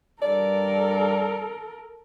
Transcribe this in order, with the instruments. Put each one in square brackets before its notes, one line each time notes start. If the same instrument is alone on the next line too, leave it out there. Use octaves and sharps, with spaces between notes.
[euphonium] G2 [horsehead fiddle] A4 A#4 [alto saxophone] D5